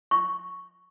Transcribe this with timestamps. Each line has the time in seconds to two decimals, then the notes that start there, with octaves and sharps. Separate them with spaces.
0.11 C#6